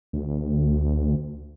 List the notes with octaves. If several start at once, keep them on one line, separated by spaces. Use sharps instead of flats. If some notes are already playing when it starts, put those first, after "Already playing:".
D2